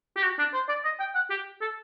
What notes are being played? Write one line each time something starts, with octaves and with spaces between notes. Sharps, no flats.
G4
F#4
D4
C5
D5
D#5
G5
F#5
G4
A4